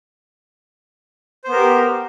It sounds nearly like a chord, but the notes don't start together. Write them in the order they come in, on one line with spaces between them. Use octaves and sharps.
C5 B3 A#4 G4